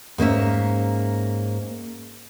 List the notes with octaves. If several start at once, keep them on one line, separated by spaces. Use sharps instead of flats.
G#2 A#3 C#4 E5